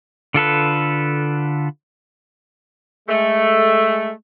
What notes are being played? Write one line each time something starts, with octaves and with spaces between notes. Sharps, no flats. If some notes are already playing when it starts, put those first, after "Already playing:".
D3 F4 A4 B4
G#3 A3